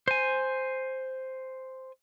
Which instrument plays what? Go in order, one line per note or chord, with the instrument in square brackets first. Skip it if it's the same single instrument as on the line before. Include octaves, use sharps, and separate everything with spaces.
[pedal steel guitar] C5 G#5